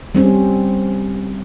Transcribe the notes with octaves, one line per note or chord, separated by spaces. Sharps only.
G3 C4 C#4